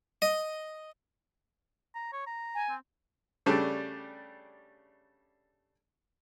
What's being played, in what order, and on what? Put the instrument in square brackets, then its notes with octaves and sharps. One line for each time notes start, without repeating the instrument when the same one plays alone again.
[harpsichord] D#5
[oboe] A#5
C#5
A#5
[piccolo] G#5
[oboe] C4
[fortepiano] C#3 G3 A3 D4